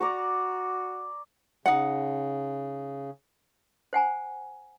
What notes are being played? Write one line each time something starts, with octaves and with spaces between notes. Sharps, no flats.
F#4 D5 A#5 C#6
C#3 D#4 F#5
C5 F#5 G#5 A#5